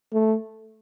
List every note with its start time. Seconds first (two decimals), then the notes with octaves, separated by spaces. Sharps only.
0.13 A3